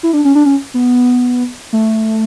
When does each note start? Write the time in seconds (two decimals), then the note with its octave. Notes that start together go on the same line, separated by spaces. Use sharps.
0.03 E4
0.13 D4
0.25 C#4
0.35 D4
0.46 C#4
0.74 B3
1.73 A3